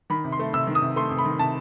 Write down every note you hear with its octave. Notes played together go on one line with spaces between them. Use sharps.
D#3 B5
C3
C6
A3
C3 E6
D#3
D#6
C3
A3 C6
C3
B5
D#3
C3 A5